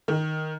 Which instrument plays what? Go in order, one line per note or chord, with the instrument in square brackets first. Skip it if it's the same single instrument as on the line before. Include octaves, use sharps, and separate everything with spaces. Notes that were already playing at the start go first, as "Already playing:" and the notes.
[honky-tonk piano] D#3